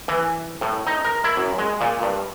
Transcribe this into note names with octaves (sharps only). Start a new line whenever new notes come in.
E3
A2
D#4
A#4
E4
F#2
G#3
A#2
G2